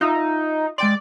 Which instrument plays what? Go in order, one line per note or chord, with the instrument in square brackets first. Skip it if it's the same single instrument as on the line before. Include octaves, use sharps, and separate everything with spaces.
[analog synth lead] D#4 [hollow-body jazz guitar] F4 E5
[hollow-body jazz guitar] G#3 G5 C6 [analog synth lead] D5